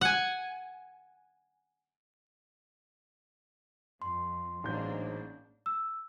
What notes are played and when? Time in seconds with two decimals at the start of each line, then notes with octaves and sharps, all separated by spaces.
0.01 F#5 G#5
4.02 F2 C6
4.64 A1 G#2 F#3 A#3 C#4 D4 G6
5.66 E6